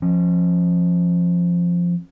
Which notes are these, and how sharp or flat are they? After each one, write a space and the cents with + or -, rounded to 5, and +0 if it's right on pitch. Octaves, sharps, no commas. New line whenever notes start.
F3 +0 C#4 -30